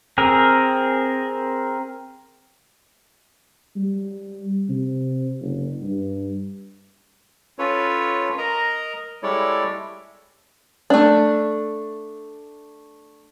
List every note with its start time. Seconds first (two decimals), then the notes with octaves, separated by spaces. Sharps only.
0.18 C4 G#4 A#4
3.76 G3
4.69 C3
5.40 F#1
5.82 G2
7.59 C#4 F4 A4 B4 C#5
8.38 A#4 D#5 A#5
9.23 G3 G#3 E4 A4 C#5 D5
10.90 A3 D4